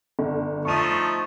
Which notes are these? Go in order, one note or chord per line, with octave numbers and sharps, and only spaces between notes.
G1
F3 A3 D#4 C#6 D#7